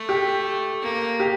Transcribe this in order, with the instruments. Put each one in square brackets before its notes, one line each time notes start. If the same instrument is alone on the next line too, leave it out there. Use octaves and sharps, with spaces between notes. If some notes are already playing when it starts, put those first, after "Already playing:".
Already playing: [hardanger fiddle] A3
[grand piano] G4
[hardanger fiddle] A#3
[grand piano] G4